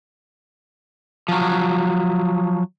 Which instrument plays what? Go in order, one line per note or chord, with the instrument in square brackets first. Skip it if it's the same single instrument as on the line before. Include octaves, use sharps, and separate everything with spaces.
[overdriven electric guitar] F3 F#3